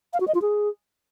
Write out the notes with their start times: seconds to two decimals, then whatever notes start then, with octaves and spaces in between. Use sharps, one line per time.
0.13 F5
0.20 F#4
0.27 D#5
0.35 F4
0.42 G#4